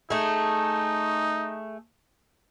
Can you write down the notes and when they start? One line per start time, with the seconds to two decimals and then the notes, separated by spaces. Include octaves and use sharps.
0.10 A3 D#4 G#4